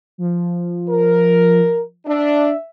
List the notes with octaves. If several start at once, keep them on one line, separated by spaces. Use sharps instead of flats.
F3
A#4
D4 E5